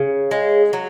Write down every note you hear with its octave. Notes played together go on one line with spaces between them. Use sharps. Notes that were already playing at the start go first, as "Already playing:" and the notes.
Already playing: C#3
G#3
F#3